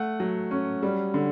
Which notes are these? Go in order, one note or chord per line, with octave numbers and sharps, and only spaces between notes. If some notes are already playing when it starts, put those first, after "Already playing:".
Already playing: A3 F#5
F#3
C#4
G3
D3